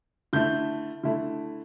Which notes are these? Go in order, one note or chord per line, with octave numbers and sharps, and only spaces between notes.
D3 A3 E4 G6
D3 A3 E4